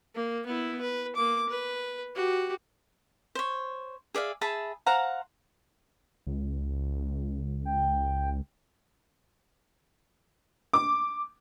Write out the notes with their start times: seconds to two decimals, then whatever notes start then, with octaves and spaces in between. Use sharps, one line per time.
0.15 A#3
0.46 B3 E4
0.81 B4
1.16 A#3 D6
1.49 B4
2.15 F#4 G4
3.35 C5 C#5
4.14 G#4 D5 E5 F5
4.41 G#4 E5 A5 B5
4.86 C5 F5 F#5 A#5
6.27 C#2
7.65 G5
10.73 D6